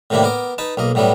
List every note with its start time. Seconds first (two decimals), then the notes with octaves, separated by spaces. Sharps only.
0.10 A2 C3 D#3 A#3 D4 E4
0.23 B3 A#4 D6
0.58 D#4 B4 A5
0.77 B1 A#3 D#5
0.95 A2 F#3 G3 A3 B3